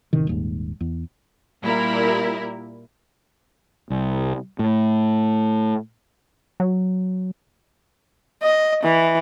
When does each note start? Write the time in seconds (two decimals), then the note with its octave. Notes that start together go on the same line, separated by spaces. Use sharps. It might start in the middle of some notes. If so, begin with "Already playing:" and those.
0.13 A1 C3 D#3
0.27 D#1 D#2 G#2
0.81 E2
1.63 A#2 G3 E4 A#4
3.90 C2
4.59 A2
6.60 F#3
8.43 D#5
8.84 E3